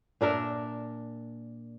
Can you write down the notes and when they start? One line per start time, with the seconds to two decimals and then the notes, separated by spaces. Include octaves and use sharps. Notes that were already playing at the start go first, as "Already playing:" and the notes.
0.21 A#2 D4 A#4 E5